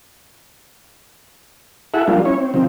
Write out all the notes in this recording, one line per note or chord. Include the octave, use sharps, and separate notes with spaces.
E4 G#4 A4 E5 F#5
F3 G3 A#3 D4 F4
C#4 E4 C#5
C4
C3 D#3 F3 C4